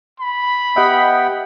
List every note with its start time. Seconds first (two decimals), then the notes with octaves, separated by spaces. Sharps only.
0.20 B5
0.76 B3 G4 D#5 E5 F#5 G5